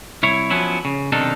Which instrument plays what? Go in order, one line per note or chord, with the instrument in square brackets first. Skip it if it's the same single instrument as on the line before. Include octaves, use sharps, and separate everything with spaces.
[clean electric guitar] C2 E4 C#5
F3 F#3 B3 C#4 E4
C#3
B1 C3 D#3 D4 D#4 A4